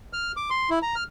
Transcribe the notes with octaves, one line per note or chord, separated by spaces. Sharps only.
F6
D6
C6
E4
A#5
F6